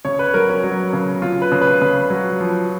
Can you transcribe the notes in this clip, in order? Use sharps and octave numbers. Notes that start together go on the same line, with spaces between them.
C#3 C#5
B4
F#3 A#4
C#4
F#3
C#3
C#3 F4
B4
C#3
B4
C#3 B4
F#3
F3